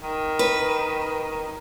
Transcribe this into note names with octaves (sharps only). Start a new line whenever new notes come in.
D#3
B4